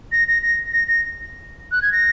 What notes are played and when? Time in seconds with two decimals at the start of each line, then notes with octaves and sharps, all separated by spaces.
0.12 A#6
0.28 A#6
0.42 A#6
0.73 A#6
0.88 A#6
1.72 F#6
1.82 G#6
1.92 A#6